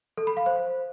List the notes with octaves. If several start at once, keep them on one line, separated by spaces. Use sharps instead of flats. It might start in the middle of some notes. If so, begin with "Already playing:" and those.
A4
B5
F5
C5